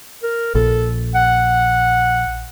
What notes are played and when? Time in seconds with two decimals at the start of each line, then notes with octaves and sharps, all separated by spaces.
0.23 A#4
0.55 A#1 A4
1.15 F#5